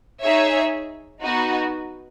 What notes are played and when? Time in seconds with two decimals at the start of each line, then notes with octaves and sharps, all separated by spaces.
0.23 D#4 G#4 C#5 E5
1.21 B3 D#4 F#4